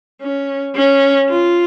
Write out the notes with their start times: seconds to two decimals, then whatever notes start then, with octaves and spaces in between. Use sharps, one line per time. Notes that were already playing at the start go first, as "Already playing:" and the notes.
0.21 C#4
0.76 C#4
1.30 F4